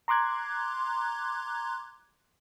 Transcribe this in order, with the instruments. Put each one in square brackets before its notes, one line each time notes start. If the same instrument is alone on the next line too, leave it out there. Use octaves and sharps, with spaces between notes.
[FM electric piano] A#5 C6 D6 F#6 G#6